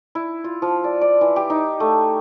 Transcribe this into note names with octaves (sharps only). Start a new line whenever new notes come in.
E4
F4
F3
D5
D5
E3
G4
D#4
A3